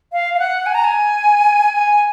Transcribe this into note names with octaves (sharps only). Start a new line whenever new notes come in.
F5
F5
F#5
G#5
A#5
G#5
G#5